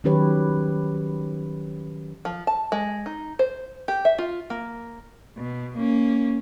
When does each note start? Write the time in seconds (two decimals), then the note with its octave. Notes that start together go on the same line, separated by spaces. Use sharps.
0.04 D#3 F#3 C#4 G4 B4 C#5
2.25 F3
2.47 A5
2.72 G#3
3.06 D#4
3.39 C5
3.88 G4
4.05 E5
4.18 F4
4.50 A#3
5.38 B2
5.76 A#3 C#4